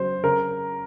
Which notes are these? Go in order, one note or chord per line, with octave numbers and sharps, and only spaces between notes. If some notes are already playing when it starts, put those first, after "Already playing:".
Already playing: C#3 F#3 C5
C#3 A#4